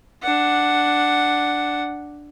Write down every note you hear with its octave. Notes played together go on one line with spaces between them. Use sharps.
D4 F#5